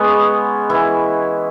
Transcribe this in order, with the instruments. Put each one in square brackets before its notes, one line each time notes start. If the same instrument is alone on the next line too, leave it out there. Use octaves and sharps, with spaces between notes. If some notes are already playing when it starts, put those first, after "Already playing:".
Already playing: [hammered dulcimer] G#3 B3 C#4 G#4 B4 C#5
E3 E4